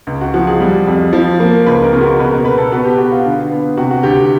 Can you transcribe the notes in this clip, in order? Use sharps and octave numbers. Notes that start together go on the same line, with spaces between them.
C#2
F#4
F3 F#4
G#4
G3
F2
F3
A#3
C#2 B4
A#4
C#3
F#4
B2 B4
A#4
B2 B4
A4
B3 F#4
G4
B3 F#4
F4
D3
B3
C3 F#4
F#4
D2 G4